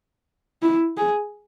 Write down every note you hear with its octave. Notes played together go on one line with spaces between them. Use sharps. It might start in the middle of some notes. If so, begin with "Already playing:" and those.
E4
G#4